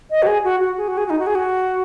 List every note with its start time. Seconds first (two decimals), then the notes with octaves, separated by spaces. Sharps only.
0.11 D#5
0.23 F#4
0.27 G#4
0.44 F#4
0.60 F#4
0.78 G#4
0.88 F#4
0.98 G#4
1.06 F#4
1.10 D#4
1.19 F#4
1.27 G#4
1.35 F#4